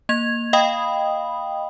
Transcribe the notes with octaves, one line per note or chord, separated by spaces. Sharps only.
A#3 G#6 F7
D#5 F5 G5 B5 D#6